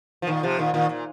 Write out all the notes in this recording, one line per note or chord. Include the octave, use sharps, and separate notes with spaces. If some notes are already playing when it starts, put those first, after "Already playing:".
F3
A#2 D#3
C3 F3
A#2 D#3
A#2 D#3
A#2